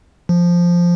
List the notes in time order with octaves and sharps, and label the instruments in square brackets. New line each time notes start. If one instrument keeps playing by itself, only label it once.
[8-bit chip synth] F3